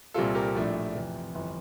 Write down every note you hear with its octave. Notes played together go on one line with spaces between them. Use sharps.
C2 A#2 G3 C4 F4 A4
G4 A#4
A#1 A2 F3 A3 D4
F2 C3 E3
G1 F2 E3